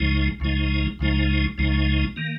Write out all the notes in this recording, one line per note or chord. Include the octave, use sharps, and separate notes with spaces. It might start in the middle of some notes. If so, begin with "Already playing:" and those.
Already playing: C#2 C#3 F3 G#3 D#4
C#2 C#3 F3 G#3 D#4
C#2 C#3 F3 G#3 D#4
C#2 C#3 F3 G#3 D#4
D#3 A#3